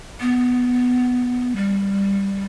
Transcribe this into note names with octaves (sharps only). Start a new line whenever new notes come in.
B3
G3